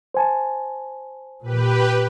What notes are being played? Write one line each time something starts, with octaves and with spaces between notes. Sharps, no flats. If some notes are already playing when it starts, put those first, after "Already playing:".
C5 G#5 A5
A#2 G4 B4